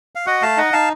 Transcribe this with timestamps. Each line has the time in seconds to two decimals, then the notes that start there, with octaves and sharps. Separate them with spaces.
0.15 F5
0.26 F#4 D#5 F#5
0.42 A3 F5 A5
0.57 D#4 D#5 F#5
0.73 D#4 F5 A5